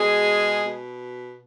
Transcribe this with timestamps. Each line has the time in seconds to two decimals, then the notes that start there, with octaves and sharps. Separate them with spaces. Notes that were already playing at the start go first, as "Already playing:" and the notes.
Already playing: B2 G#3 G#4
0.63 B2